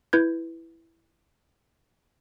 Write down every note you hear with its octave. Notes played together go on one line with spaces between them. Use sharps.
E4 B4 G6 G#6